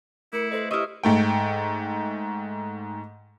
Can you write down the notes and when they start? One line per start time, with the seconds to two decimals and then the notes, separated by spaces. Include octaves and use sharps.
0.33 A3 E4 A#4 C#7
0.51 A4 B4 C5 D#5
0.71 E4 G4 D#5 E5 C#6 E6 F6
1.03 G#2 A3 G5